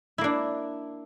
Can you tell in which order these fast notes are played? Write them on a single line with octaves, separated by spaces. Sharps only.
E4 A#3 D4